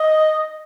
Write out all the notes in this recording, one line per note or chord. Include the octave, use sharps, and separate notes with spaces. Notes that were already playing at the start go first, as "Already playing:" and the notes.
Already playing: D#5